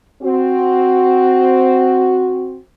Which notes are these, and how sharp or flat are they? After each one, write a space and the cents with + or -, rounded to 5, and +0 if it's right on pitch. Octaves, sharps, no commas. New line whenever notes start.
C4 +0 F#4 +0